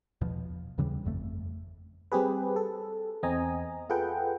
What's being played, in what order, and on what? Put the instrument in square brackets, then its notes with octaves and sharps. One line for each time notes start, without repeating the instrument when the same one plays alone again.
[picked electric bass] E2 B2 F3
D#2 C#3 E3 G3
G1 F2 A3
[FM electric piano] G3 C4 G4 G#4 B4
A4
E2 C4 D#5 G#5 A#5
F4 G#4 A4 B4 F#5 G5